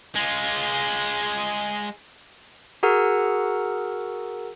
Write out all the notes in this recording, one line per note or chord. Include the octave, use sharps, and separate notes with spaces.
G#3 F4
F#4 G#4 A#4 F#5 A#5 E6